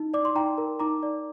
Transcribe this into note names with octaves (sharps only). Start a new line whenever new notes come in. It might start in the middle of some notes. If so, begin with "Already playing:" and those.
Already playing: D#4
D5 D6
C6
D#4 G5 A#5
A#4
D#4 A#5 D6
D5